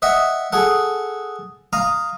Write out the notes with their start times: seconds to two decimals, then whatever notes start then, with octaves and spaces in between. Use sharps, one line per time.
0.02 D#5 E5 F#5 G5
0.52 G#4 A4 F#5
1.73 F5 A#5 D#6